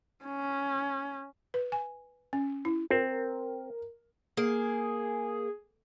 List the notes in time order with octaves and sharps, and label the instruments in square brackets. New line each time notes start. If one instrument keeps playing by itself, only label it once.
[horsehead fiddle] C#4
[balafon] B4
G#5
C#4
E4
[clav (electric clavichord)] C4 [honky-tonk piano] A#4
[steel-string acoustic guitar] A#3 [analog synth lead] G#4